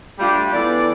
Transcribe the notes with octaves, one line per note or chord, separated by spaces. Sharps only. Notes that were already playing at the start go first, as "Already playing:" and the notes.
G3 A3 D4 F4 G4
E3 B3 D4 A4 D5